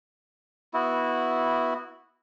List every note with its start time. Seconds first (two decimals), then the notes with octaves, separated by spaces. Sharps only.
0.74 B3 E4 F#4